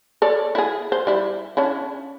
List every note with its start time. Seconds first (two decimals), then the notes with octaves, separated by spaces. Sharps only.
0.22 A4 C#5 D5
0.55 E4 G#4
0.92 C5
1.07 G3 E4
1.57 C#4 D4 E4